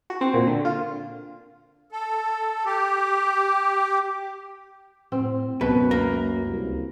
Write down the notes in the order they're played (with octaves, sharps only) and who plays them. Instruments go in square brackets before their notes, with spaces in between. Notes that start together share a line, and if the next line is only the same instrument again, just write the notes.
[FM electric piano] F#4
C4
A#2
D3
F4
[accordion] A4
G4
[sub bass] A2 [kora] C4
[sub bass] C#2 [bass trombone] F#2 [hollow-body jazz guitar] B2 [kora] B4
[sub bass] C#2 [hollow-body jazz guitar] A#3 A#4
[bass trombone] C2